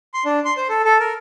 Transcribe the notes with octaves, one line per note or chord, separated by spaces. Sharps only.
C6
D4
C6
C5
A4
A4
A#4